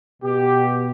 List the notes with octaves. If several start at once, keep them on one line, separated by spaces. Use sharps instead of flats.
B2 G4